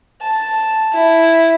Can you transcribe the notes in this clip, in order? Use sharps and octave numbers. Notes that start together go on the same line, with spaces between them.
A5
E4